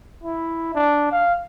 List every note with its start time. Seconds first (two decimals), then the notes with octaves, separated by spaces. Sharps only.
0.23 E4
0.75 D4
1.11 F5